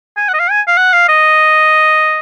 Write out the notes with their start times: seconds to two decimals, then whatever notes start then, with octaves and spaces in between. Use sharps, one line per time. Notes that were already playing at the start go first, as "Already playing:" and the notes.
0.17 G#5
0.28 F#5
0.34 D#5
0.40 F5
0.51 G#5
0.67 F5
0.77 F#5
0.93 F5
1.09 D#5